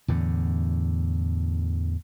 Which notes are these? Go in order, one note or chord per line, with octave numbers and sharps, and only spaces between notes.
E2 A2 D3